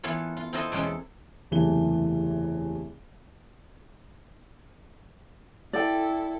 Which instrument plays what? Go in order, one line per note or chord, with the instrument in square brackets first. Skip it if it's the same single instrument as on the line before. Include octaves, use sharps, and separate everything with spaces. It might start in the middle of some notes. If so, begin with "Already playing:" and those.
[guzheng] E3 B3 F4 A4 C#5
F4
C4 E4 F4 A4 D#5
E2 B2 G#3 C#4 C6
A4
[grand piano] F#1 E2 C3 E3 A3 G7
[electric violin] E4 A4 [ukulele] D5 G5